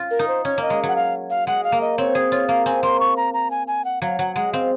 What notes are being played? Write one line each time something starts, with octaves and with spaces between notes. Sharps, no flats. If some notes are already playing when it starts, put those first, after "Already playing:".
Already playing: C#4 F4
A#4
D#4
C5
C#4 C#5
A#3 D#5
G#3
F#3 F#5
F5
F5
G#3 F#5
F5
A#3
D#5
C4 C#5
G#4
F4 C#5
A#3 F5
C4 G#5
A#3 C6
C#6
A#5
A#5
G#5
G#5
F#5
F#3 F5
F#3 F#5
G#3 F#5
C4 F5